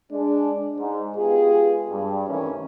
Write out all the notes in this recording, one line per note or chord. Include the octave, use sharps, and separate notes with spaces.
G#3 D4
G#2
G#3 B3 F4 G4 G#4
G2
C3 D#3 E3 A3 C#4